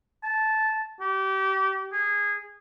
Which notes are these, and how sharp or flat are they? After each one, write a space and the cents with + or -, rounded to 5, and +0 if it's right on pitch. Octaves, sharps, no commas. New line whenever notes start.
A5 -10
G4 -30
G#4 -20